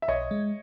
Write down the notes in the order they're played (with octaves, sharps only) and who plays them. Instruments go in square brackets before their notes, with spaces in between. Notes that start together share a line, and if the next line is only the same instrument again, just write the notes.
[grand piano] E5
[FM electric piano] B1 [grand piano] C#5 D#5
[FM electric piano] G#3